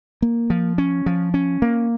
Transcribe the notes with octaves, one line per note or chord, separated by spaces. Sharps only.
A#3
F3
C#4
F3
C#4
A#3